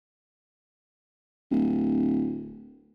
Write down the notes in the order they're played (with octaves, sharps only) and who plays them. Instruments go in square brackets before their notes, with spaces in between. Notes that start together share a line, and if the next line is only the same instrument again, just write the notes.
[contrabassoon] D1